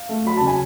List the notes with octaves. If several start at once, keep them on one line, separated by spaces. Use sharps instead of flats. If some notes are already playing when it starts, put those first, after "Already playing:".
Already playing: F5
A3
F#3 B5
C#3 A5
G#5